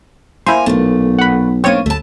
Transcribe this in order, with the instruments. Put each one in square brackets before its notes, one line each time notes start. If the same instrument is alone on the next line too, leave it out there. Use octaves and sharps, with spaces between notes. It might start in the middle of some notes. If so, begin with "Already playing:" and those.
[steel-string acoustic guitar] A#3 G#5 A#5 [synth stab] E4 C5
[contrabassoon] B1 [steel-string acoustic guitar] A#2 A3
[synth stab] F#5 B5
[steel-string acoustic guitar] A#3 D4 [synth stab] C4 C#5 D#7
[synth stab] D2 [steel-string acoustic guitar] A3 A5